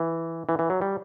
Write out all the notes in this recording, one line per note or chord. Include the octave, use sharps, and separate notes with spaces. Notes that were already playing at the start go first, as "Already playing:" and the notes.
Already playing: E3
E3
E3
F#3
G3